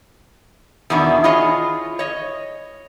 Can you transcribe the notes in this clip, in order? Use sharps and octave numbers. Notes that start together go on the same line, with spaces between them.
E2 B2 D#3 D4 E5
E4 F4 G#4 C#5 D#5
C#5 D#5